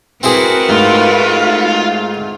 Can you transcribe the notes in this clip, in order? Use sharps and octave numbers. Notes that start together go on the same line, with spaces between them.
C4 E4 F#4 G#4 A#4 B4
G#2 A3 F4